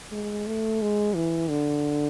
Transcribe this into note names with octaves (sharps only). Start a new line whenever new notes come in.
G#3
A3
G#3
E3
D3